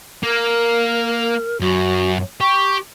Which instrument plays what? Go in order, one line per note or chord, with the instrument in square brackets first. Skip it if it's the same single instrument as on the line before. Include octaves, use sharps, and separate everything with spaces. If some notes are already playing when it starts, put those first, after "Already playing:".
[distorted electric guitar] A#3 [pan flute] A#4
[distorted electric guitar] F#2 [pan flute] F#4
[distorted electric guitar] G4 [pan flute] C#6